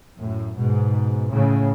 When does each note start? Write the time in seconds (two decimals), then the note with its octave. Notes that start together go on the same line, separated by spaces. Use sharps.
0.19 F#2 A2
0.57 G#2 B2
1.31 A2 C#3